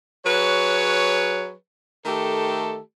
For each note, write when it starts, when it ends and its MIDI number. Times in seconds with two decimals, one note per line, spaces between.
0.25 1.53 54
0.25 1.53 68
0.25 1.53 71
0.25 1.53 73
2.05 2.78 51
2.05 2.78 57
2.05 2.78 67
2.05 2.78 69